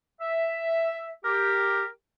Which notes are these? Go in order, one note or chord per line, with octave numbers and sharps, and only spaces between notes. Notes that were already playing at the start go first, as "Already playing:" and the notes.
E5
G4 A#4